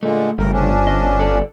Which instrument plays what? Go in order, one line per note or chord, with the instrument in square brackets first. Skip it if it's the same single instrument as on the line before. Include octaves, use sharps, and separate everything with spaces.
[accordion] A#2 D3 G#3 [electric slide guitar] A3
[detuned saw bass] G1 [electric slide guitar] C#3 G3 A3 [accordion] A#4
[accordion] F3 C#4 D4
[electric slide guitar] D#5
A4 D5